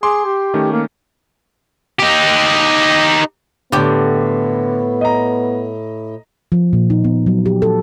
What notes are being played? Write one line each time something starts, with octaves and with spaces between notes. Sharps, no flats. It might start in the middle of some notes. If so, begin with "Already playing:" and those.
G#4 C6 D6
G4
D#3 A3 C#4
A#3
D#4 G4
A2 D3 B3 G4 G6
D#5 A#5
F3
A#2
D#4
B3
F#3
G4
A4